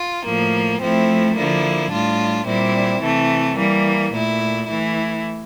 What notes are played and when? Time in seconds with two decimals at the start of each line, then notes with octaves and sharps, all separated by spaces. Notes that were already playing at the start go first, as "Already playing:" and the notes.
Already playing: F4
0.26 A2 F3 A#3
0.81 F3 A3 C4 E4
1.37 D3 F3 A#3 E4
1.92 A2 G3 D4 F4
2.46 A#2 G3 C4 E4
3.03 C3 E3 A3
3.57 E3 G3 A#3
4.12 A#2 A3 E4
4.67 E3 A3 E4